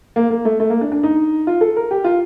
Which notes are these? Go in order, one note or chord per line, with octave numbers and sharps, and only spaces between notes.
A#3
A#3
A3
A3
A#3
D4
D4
D#4
F4
A4
A#4
G4
F4